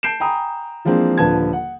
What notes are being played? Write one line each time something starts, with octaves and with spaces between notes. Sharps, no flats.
A5 G6 C7 D7 E7
G5 G#5 A#5 B5 D#6
E3 F3 G#3 A#3 C4 D4
D#1 D3 F3 B4 A5 G#6
F#5